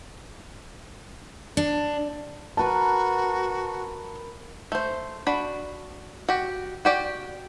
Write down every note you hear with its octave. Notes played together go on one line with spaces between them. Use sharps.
D4
F#4 A#4 B4 A5 B5
A3 C5
D4 F#4 B5
F#4 G4
F#4 G4 D5